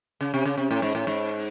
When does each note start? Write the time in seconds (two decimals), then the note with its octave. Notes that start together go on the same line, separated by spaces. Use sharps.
0.21 C#3
0.34 C3
0.45 C#3
0.58 C3
0.71 A2
0.82 G#2
0.95 A2
1.07 G#2